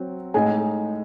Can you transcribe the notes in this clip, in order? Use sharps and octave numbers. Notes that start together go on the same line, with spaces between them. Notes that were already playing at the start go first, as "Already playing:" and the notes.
Already playing: F#3 C4
A2 G#3 D#4 G#5